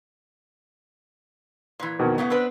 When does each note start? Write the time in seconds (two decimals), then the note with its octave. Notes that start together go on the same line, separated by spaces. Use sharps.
1.80 A#2 E3
1.99 F2 B2 D#3
2.18 A2 C#3 A3 B3
2.30 C4 D4 B4